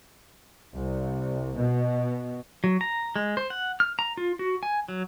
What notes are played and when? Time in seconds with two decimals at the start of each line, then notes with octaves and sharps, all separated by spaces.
0.75 C2
1.56 B2
2.64 F#3
2.81 A#5
3.16 G#3
3.37 C5
3.50 F#5
3.80 F6
3.99 A#5
4.17 F4
4.39 F#4
4.63 G#5
4.89 F#3